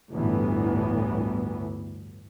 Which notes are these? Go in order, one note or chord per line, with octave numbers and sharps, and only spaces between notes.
G1 D2 A2 E3 B3